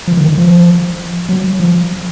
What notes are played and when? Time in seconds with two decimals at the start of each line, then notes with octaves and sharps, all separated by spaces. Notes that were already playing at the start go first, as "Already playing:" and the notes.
0.07 F3
0.17 D#3
0.28 D#3
0.37 F3
1.29 F#3
1.60 F3